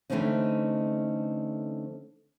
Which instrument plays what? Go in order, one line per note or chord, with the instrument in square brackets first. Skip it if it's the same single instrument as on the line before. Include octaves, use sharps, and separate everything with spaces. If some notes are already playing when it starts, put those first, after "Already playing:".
[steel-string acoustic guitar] D3 E3 A3 C4 C#4 D#4